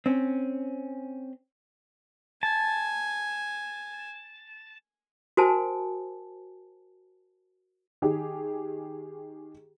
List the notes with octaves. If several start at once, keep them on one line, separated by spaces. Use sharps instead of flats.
C4 C#4
G#5 A5
F#4 A#4 C5 G#5 A5
D#3 G4 G#4